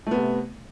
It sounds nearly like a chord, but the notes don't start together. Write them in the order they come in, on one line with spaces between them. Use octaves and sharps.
A3 B3 C3